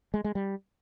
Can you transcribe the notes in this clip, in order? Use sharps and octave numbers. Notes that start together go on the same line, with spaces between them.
G#3
G#3
G3